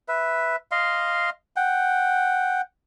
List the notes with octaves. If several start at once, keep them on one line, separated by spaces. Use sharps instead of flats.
B4 E5
D#5 F5 C6
F#5 G5